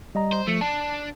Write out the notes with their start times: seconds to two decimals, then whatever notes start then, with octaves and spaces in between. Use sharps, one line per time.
0.15 G3 D#5 A#5
0.32 C5
0.48 F3 A3 C#7
0.61 D4 A5